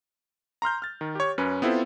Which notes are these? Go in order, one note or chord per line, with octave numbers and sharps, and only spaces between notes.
A#5 C6 F6 G6
F6 A6
D#3
G4 C#5
F#2 C#4 B4
B3 C4 E4 F4 A4 C5